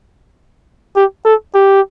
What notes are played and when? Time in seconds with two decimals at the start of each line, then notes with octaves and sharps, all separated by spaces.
0.96 G4
1.25 A4
1.54 G4